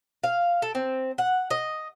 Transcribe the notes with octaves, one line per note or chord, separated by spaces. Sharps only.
F5
A4
C4
F#5
D#5